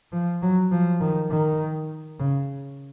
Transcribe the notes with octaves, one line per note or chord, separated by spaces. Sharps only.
F3
F#3
F3
D#3
D#3
C#3